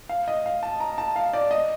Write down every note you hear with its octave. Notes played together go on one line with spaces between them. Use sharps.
F5
D#5
F5
A5
A#5
A5
F5
D5
D#5